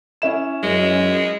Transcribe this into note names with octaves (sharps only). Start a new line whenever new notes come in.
C#4 E4 E7
F#2 G#3